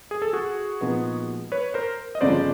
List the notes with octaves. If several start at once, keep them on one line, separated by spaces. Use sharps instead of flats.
G#4
A4
F#4 G#4
A#2 F3 G#3 B3 D#4
B4 C#5
A#4 C5
D#5
G1 F2 C#3 F3 G#3 C5 D5